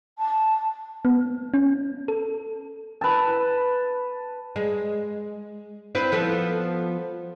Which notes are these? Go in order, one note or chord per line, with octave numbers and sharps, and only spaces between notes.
A5
B3
C#4
A4
B4 A5
G#3
C4 E4 B4
F3 B3 A4